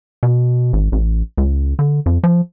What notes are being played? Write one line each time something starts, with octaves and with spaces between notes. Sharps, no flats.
B2
G#1
A1
C#2
D3
F2
F3